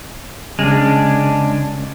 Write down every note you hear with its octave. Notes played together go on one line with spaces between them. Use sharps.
C#3 G#3 C#4 D4 F6